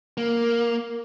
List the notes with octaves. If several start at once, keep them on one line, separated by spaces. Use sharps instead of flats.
A#3